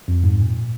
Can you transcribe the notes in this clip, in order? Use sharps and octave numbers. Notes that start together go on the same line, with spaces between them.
F2
G#2
A#2